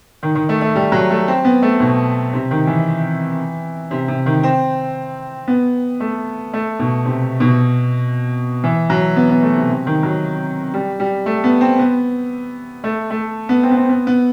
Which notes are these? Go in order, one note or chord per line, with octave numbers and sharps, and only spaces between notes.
D#3
D#3
A3
A3
G3
F#3
A3
C4
B3
A3
B2
C3
D#3
E3
C3
C3
D#3
C4
B3
A3
A3
B2
C3
B2
E3
F#3
B3
B3
A3
C3
C3
D#3
F#3
G3
G3
A3
B3
C4
B3
A3
A3
B3
C4
B3
C4
B3
B3